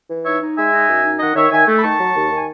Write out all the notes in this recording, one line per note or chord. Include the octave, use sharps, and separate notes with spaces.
E3
D#4 C#5 E5
D#4
G#3 E5 G#5
D#4
F#2
D#4
D#3 D#5 F#5
D#3 C#5 E5
D#3 E5 G#5
A3
B5
D#3 A5 C#6
F#3
D#2
D#3 G#5